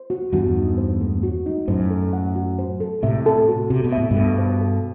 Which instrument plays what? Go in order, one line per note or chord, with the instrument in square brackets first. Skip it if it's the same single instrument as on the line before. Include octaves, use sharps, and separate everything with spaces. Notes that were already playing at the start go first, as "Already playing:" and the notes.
Already playing: [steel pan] C5
F#4
[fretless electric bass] E2 G2 [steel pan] F#4
[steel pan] D#4
C5
A3
F#4
D#4
[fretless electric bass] F#2 A2 [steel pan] C5
[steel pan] A4
F#5
F#4
C5
A4
[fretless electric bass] A2 C3 [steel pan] E5
[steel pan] A4
F#4
[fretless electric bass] C3 [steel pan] F#4
[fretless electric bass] B2
[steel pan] E5
[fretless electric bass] A2
[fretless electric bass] G2 B2 [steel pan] A4
[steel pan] C5
A4